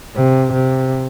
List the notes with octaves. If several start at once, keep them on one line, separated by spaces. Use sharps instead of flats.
C3
C3